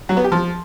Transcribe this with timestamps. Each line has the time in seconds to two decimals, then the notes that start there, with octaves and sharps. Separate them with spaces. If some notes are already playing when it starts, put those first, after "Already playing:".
0.09 F#3
0.17 B3
0.24 G4
0.32 F3